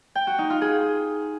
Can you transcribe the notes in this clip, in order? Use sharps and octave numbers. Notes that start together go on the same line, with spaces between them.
G5
F#4
D#4
F4
G#4